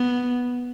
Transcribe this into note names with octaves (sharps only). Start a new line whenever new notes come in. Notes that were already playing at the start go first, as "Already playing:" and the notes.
Already playing: B3